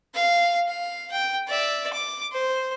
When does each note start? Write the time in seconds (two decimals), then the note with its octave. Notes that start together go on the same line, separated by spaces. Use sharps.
0.14 F5
0.68 F5
1.12 G5
1.47 D5 E5
1.93 D6
2.32 C5